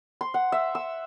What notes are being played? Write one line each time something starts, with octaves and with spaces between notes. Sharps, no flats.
C6
F#5
E5
E6